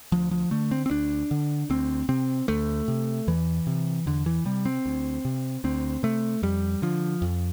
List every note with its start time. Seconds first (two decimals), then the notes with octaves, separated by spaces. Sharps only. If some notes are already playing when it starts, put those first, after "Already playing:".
0.12 D2 F3
0.31 F3
0.51 D3 A3
0.71 C4
0.86 C4
0.90 D2 D4
1.31 D3
1.70 D2 C4
2.09 C3 C4
2.48 D2 A3
2.88 C3
3.27 E2 E3
3.67 C3
4.06 E2 D3
4.26 E3
4.45 C3 G3
4.65 C4
4.86 D2
5.25 C3
5.64 D2 C4
6.03 C3 A3
6.43 F2 G3
6.82 D3 F3
7.22 F2